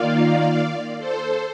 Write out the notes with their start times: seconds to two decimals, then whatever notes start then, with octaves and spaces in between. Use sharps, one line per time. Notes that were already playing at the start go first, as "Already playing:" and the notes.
Already playing: D#3 A#3 F4 D5 F5
0.98 A4 C5